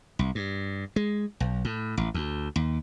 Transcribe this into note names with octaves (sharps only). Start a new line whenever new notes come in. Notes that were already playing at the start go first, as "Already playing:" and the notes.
C2
G2
G#3
B1
A2
A1
D2
D#2